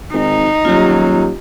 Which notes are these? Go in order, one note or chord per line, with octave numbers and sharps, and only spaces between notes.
G#1 D#4
D#1 F#3 F4 G4